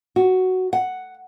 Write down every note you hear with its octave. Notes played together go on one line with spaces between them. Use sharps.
F#4
F#5